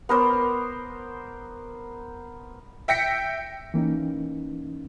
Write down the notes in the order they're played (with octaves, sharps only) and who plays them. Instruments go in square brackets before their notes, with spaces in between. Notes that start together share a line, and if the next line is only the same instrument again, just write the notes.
[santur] B3 A#4 C5 D5
[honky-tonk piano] E5 G5 A#6 B6 C#7
[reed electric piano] E3 A#3 C#4 D#4